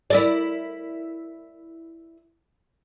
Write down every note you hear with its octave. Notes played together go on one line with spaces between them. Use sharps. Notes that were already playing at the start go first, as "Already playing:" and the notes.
E4 A#4 D5